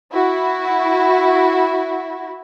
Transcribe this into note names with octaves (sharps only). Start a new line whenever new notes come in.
E4 F#4